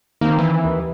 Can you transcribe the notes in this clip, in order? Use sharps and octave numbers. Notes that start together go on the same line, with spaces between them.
D#3 A#3 C4
E3
D#2